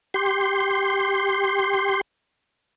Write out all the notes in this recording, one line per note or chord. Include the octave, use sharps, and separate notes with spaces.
G4 C6